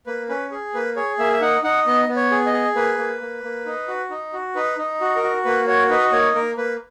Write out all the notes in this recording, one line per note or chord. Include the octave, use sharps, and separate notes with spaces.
A#3 B4
C#4 B4
G#4
A#3 B4
G#4 C#5
A#3 E5
E5
D#4 F#5
D#4 F#5
B3 D#5
B3
C#5
G#4
D#5
G#4
A#3 B4
A#3
A#3
A#3
D#4
F#4
D#4
F#4
D#4 B4
D#4
F#4
A#4
F#4
A#3 B4
F#4 C#5
D#4 B4
A#3 C#5
A#3 A#4
A#3 B4